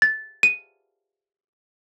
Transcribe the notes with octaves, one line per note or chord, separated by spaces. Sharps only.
A6
D#7